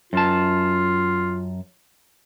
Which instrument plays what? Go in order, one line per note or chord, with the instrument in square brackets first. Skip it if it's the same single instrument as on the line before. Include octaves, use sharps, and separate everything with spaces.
[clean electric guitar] F#2 A5 [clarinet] F4